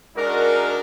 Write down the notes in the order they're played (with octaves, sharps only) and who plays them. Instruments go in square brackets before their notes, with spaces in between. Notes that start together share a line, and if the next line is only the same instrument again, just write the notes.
[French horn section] G#3 D5 [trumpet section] D4 D#4 F#4 [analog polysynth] A#4